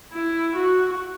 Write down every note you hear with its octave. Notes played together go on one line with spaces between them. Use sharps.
E4
F#4